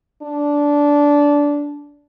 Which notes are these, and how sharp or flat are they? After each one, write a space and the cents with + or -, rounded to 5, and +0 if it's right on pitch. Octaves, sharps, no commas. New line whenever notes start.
D4 -15